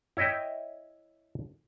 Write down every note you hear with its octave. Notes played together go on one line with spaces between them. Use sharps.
E4 C#5 D#5 E5 G5